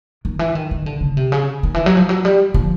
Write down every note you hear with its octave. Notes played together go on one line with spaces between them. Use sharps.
D#3
E3
D#3
D#3
D3
C#3
C3
C#3
D#3
E3
F#3
F3
F#3
G3
F3